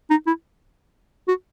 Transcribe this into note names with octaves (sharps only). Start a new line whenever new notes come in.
D#4
E4
F#4